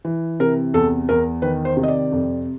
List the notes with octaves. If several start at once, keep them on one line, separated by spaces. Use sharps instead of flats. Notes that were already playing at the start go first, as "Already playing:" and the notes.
E3
C3 A#4
E2 A4
E2 A#4
D#3 B4
C5
C3
D#5
D5
F2